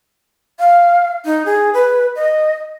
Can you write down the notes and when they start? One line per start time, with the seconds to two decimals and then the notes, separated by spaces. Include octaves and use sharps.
0.59 F5
1.25 D#4
1.46 G#4
1.74 B4
2.16 D#5